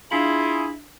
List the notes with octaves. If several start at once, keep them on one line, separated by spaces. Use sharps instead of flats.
D4 E4 F4 G#4 B6 F#7